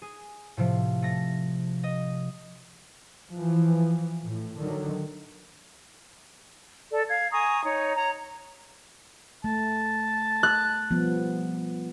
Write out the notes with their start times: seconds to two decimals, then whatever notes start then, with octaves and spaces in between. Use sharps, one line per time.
0.02 G#4
0.57 A2 C3 F3
1.02 A3 A#6
1.83 D#5
3.32 E3 F3
4.24 A2
4.58 D3 D#3 F#3
6.90 A4 D5
7.08 F5 G#6
7.31 G#5 A#5 C#6 D#6
7.64 D#4 C#5
7.95 C#5 A#5
9.44 A3 A5
10.43 F#6
10.91 F3 G3 B3